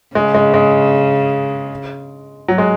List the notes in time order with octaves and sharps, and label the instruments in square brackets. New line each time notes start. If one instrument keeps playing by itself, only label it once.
[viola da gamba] C#3 [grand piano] G#3
[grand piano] G#3
G#3
F#3
G#3